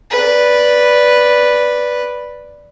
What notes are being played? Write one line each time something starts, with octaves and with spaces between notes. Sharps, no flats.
B4 D5